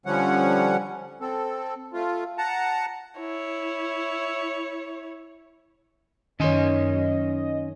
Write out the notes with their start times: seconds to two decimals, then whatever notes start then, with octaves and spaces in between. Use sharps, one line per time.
0.06 D3 F3 G3 C#4 F#5
1.21 C4 A4
1.93 A3 F4
2.38 F#5 A5 A#5
3.19 E4 C#5
6.40 F#2 D#3 C#4 C#5 D#5 G#5 C6